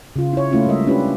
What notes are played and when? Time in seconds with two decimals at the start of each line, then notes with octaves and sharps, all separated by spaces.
0.16 C#3 F4
0.33 E4 C#5
0.52 A3 A#3 C#4 E4 F4
0.66 G3 G#3 A#4 D#5 E5
0.87 C#4 D4 E4 F4 G4 B4